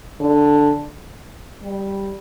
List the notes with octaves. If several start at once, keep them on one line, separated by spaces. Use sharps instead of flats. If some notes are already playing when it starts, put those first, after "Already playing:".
D3
G3